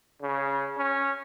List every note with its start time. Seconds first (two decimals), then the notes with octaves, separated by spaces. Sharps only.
0.22 C#3
0.78 C#4